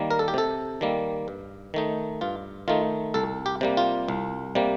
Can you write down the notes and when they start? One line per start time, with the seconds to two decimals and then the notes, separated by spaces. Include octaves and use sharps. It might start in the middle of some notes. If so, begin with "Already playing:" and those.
Already playing: D#3 G3 A#3
0.11 A#4
0.19 A4
0.28 G4
0.34 C3 A4
0.81 D#3 G3 A#3
1.28 G2
1.74 D#3 A3 D#4
2.21 G2 F4
2.68 D#3 A3 D#4 F4
3.14 C2 A4
3.46 G4
3.61 C3 G3 A#3
3.77 F4
4.08 C2
4.55 C3 G3 A#3